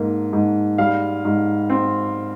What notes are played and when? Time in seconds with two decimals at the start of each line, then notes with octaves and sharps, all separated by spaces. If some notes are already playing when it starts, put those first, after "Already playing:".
Already playing: G#2 A#3
0.33 G#2
0.78 G3 F5
1.25 G#2
1.70 C4